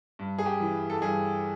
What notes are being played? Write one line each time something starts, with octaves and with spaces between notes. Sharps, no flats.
G2
G#4
G4
E3
A4
G2 G#4